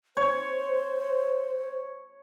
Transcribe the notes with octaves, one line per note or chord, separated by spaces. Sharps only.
C5 C#5